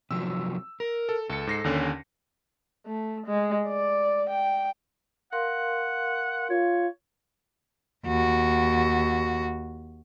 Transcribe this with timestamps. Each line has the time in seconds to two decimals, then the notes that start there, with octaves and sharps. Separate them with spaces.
0.11 C3 F3 F#3 E6
0.80 A#4
1.09 A4
1.30 C#2 A4 C#7
1.47 G#2 A#6 C7
1.64 D#2 D3 C#4
2.87 A3
3.27 G#3
3.68 D5
4.30 G5
5.33 A#4 F5 F#5 C6
6.50 F4 C#5
8.05 D#2 F#4